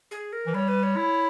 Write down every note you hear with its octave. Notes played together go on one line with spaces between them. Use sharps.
G#4
A#4
E3
G3 C#5
B4
C#5
E4